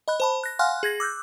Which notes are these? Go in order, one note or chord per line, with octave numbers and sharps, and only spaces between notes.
D#5 B5 F#6
C5 A5 B5
F#6 A#6
F5 F#5 G#5 C6 F6 F#6
G#4 G#6 A#6
D6 E6 F#6 G6